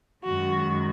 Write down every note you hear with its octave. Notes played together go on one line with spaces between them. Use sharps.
F#2 D#3 G#3 F#4